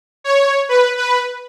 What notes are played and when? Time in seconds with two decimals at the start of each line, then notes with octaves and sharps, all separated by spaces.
0.24 C#5
0.69 B4
0.97 B4